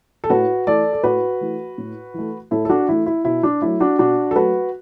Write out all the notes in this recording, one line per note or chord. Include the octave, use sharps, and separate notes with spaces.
A4
A2 F#4 B4
E3 A3 A4 D5
A4
A2 F#4 B4
E3 A3
A2
E3 A3
A2 E4 A4
A4
D4 F#4
E3 A3 E4
E4
B2 E4
D4
F#3 A3 E4
D4 F#4
B2 D4 F#4
A4
F#3 A3 F#4 B4